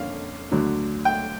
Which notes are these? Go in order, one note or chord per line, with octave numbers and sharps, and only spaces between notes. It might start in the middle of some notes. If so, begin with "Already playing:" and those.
Already playing: F2 D3 A#3 C#4 F5
D2 D3 F#3
G5